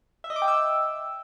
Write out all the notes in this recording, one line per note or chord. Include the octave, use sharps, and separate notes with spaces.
E5
D#5
D6
G5
E6